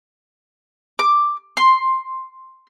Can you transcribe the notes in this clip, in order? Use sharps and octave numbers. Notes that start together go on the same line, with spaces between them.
D6
C6